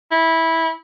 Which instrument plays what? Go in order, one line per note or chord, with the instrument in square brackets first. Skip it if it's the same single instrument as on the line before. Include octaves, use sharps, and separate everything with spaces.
[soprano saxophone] E4